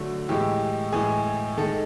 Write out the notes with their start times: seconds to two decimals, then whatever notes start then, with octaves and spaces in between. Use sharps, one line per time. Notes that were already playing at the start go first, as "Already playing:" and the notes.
Already playing: D3 F#3 A3 F#4
0.28 A2 E3 G#3 G4
0.92 A2 E3 G#3 G#4
1.57 D#3 G#3 A4